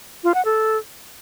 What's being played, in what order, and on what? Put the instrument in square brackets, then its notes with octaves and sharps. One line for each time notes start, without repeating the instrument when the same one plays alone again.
[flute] F4
F#5
A4